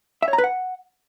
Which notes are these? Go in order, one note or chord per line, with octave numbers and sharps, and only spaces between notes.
E5
C#5
A#5
B4
F#5